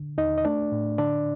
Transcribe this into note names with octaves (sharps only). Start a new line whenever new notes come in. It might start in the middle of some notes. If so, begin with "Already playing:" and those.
Already playing: D3
D#2 D#4 D#5
D#5
A3 D4 D5
A2
D3 D4 D5